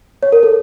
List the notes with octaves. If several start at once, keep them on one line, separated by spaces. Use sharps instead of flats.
C#5
A#4
A4